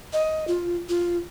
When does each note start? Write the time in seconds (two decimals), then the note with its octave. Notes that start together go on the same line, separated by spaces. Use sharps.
0.13 D#5
0.48 F4
0.89 F4